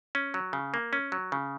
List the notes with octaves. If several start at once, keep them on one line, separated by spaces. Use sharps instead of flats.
C#4
F#3
C#3
A#3
C#4
F#3
C#3